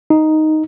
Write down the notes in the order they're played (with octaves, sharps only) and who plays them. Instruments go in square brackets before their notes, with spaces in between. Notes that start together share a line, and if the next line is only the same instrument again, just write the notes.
[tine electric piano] D#4